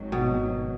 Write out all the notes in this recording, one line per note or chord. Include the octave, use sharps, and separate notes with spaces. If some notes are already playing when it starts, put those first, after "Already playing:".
Already playing: G#1 G#2 D#3 F#3
B2